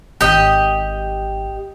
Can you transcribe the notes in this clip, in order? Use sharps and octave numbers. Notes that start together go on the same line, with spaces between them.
G#1 G4 D#5